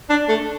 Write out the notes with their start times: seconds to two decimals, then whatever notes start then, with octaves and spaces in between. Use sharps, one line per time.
0.10 D4
0.29 A3